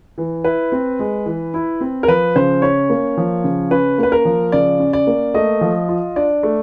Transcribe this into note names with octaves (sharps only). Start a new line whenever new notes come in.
E3
E4 B4
C4
G#3
E3
E4
C4
A#4
F3 B4
C#3 C5
C#4 C#5
A#3
F3
C#3
C#4 B4
A#3 B4
A#4
F3
C#3 D5
C#4
D5
A#3
A3 D#5
F3
F4
D4 D5
A3